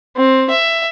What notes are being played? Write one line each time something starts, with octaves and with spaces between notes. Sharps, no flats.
C4
E5